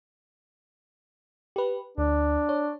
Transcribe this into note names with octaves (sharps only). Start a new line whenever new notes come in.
G4 B4
D2 D4
C#5